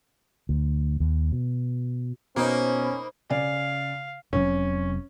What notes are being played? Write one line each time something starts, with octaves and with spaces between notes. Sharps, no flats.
D2
D#2
B2
B2 A#3 C#4 D#4 C5 B5
C#3 D5 F5 G#5
F1 C3 F#3 C#4